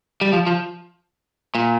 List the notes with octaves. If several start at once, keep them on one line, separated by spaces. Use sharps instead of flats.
G3
F3
F3
A#2